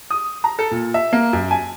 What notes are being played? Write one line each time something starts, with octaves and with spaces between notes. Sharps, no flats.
D#6
A#5
A4
A#2
E5
A#3
F#2
G#5